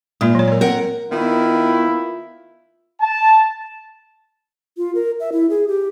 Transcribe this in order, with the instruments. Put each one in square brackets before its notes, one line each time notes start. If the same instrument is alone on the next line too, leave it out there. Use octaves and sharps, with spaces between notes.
[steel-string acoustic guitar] A#2 [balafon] G#3 A#3 F4
[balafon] F#3 C#5
A#4 C#5
[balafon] C4 [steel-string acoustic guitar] A#4 F#5
[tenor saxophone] D#3 [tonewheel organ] B3 [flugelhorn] E4 [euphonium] F4
[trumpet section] A5
[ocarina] F4
A#4
E5
E4
G#4
G4